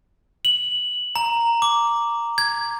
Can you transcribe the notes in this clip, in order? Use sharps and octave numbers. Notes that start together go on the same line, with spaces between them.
F#7
A#5
D6
G#6